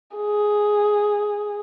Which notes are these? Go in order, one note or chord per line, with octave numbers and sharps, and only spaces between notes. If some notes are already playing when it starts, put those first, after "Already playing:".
G#4